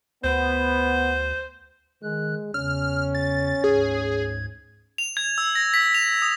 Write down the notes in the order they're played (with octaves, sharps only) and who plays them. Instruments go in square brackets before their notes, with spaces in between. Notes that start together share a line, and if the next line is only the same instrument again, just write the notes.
[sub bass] D2 [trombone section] B3 [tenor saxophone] C5
[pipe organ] D#3 F#6 [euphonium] G#3
[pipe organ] E2 C#3 [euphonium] C#4 [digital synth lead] F6
[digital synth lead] F6
A6
[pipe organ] D2 G#2 G#6 [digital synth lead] G#4
[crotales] F7
G#6
E6
A#6
B6
F7
D#6